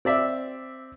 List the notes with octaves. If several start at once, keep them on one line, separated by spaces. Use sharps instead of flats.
C4 D5 E5